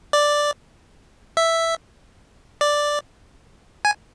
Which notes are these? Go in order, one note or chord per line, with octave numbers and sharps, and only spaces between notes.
D5
E5
D5
G#5